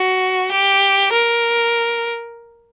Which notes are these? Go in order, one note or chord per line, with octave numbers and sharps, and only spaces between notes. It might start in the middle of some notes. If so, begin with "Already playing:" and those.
Already playing: F#4
G4
A#4